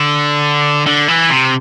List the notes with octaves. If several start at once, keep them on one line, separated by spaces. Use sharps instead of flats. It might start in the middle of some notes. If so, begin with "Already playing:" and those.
Already playing: D3
D3
E3
C3